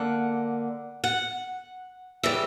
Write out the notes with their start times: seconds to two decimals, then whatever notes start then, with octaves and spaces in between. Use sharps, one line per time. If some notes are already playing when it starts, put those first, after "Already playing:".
Already playing: D3 A#3 F#5
1.04 F#5
2.23 C#3 E3 G3 E5